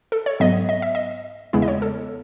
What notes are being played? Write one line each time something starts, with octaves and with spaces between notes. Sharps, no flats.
A4
C#5
G#2 F#3 B3 D#5
D#5
E5
D#5
E2 C#3 G#3 B3 E4
D#5
C#5
A4